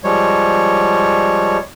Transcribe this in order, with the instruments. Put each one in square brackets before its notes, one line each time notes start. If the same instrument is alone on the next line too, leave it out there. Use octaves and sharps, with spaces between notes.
[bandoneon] F3 G3 G#3 C#5